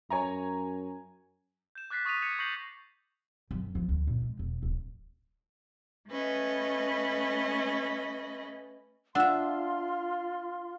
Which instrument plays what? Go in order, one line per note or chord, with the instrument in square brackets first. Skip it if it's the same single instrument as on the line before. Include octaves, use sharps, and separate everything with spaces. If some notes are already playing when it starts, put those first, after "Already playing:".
[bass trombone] F#2 [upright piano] C#5 G#5 A#5
[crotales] G6 E7
D6 F#6 A6 B6 C7
C#6 D#6 A6 B6 D#7 F7
D6 G#6 C#7 F7
C#6 D6 G6 A#6 C7 F#7
[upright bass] F#2
F3
D2
A#2
G#3
E1
D1
[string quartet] A3 C#4 B4 D#5
[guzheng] D4 E5 [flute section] F4 C6 F6 [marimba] F#5 E6